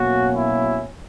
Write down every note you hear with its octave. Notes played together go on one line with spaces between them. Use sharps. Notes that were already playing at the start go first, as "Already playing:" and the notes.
Already playing: B2 F#3 A#3 C#4 F#4
E4